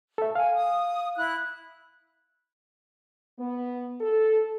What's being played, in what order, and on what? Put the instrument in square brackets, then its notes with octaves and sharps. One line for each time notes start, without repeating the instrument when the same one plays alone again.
[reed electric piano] A4 E5
[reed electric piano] F5 [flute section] G#5
[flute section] D#6
E4 F#6
[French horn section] B3
A4